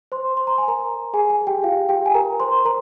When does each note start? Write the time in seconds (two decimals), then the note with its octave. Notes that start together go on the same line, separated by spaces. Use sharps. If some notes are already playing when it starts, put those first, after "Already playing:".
0.12 C5 C6
0.37 C6
0.47 A#5
0.58 G#5
0.68 A#4 A#5
1.14 G#4 G#5
1.30 G#4 G#5
1.47 G4 G5
1.64 F4 F5
1.89 G4 G5
2.06 G#5
2.14 A#4 A#5
2.40 C5 C6
2.65 A#4 A#5